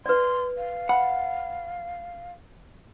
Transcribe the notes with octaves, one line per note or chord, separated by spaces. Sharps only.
B4 D5 C6
F5
F#5 B5